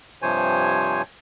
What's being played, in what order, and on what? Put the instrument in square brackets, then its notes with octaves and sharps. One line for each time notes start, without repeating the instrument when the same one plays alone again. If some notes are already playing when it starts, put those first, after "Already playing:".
[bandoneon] G2 C3 F3 C5 C#5 G#5